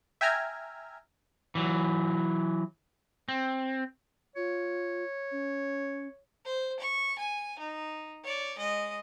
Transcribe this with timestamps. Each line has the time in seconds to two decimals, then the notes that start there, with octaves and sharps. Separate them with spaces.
0.21 E5 G5 G#5 A#5 F6 G#6
1.55 E3 F#3
3.29 C4
4.36 F4 C#5
5.31 C#4
6.45 C5
6.80 C#6
7.19 G#5
7.59 D#4
8.23 C#5 D5
8.58 G#3 D#5